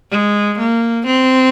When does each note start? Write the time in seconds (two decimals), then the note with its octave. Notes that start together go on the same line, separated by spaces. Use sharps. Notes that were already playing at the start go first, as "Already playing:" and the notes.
0.11 G#3
0.59 A#3
1.07 C4